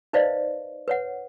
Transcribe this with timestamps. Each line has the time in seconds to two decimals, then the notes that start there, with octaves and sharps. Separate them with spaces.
0.13 D#4 B4 C5 D5 D#5 F5
0.88 B4 C#5 F#5